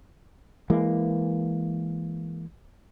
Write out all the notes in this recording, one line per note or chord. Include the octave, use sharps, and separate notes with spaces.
E3 G#3 A#3